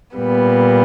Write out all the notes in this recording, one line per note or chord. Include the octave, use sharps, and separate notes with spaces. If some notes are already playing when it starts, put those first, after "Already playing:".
A#2 G3 B3